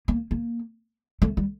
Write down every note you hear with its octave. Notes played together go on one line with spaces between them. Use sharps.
A#3
A#3
A3
G3